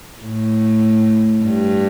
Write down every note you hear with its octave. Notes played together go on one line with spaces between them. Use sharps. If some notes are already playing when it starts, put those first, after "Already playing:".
A2
G2